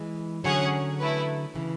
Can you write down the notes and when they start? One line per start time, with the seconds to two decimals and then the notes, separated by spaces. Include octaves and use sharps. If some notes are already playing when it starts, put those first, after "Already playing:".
Already playing: E3 G#3
0.44 D3 F#3 C#4 G#4 C#5 F#5
1.00 A3 E4 B4
1.55 C#3 E3